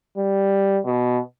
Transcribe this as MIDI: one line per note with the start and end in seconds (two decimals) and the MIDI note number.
0.18 0.79 55
0.85 1.19 47